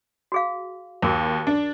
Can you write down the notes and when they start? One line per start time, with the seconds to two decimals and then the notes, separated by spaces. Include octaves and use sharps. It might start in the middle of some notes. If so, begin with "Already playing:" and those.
0.32 F#4 G#4 F5
1.02 D#2 F#4 G#4 A#4
1.47 D4